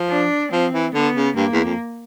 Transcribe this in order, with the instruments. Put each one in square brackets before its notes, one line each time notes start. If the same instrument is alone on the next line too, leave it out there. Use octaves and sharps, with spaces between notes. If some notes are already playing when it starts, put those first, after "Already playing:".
Already playing: [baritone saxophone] F3
[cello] D4
[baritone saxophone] F3 [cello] C4
[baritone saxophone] E3
[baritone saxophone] D3 [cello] B3
[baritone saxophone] C#3
[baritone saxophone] G2 [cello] A#3
[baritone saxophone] E2
F2